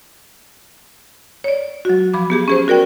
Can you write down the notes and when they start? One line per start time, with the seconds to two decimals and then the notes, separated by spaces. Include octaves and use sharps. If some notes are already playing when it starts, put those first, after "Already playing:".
1.44 C#5 D5
1.85 F#3 F#4
2.14 F3 B5 D6
2.30 B3 G4 G#4
2.48 C#4 G#4 C5
2.68 F#4 A#4 D5 G5